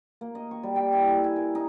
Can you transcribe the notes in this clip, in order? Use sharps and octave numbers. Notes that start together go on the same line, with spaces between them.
A#3
D#5
C#6
G3
G5
E4
A4
G#5
A#4
D#4